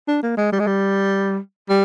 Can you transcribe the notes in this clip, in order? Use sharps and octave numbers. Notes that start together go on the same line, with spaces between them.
D4
A#3
G#3
G3
G#3
G3
G3